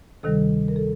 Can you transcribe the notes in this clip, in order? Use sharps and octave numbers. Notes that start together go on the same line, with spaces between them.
D2 C3 D#3 G3 A4
A#4
A4